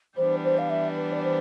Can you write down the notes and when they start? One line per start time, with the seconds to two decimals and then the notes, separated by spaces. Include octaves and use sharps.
0.17 E3 G3 B3 D4 C5
0.44 C5
0.58 F5
0.70 E5
0.97 B4
1.12 D5
1.23 C5